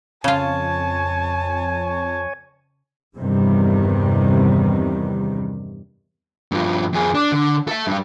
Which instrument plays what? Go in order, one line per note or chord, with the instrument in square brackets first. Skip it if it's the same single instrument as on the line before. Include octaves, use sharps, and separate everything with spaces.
[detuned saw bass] F2 [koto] C#3 F4 [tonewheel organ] C#5 G#5 [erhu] A5
[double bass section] E2 G2 C3 D#3 G3
[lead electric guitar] G2 F3
F2 G#4
D4
D3
A4 E5
G2 G3